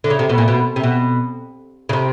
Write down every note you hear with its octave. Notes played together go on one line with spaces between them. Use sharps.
D3
C#3
C3
B2
A#2
B2
C3
B2
C#3
C3